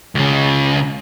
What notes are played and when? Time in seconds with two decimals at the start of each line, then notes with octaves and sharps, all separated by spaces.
0.15 C#2 C#3